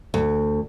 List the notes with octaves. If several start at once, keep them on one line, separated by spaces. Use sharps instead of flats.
D2